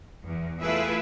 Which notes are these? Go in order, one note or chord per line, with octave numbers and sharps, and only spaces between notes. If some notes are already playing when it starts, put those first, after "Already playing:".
E2
A3 E4 F4 G#4 B4 E5